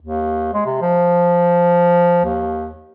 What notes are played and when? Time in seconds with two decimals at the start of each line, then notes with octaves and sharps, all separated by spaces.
0.02 D#2
0.54 G#3
0.66 C3
0.82 F3
2.25 D#2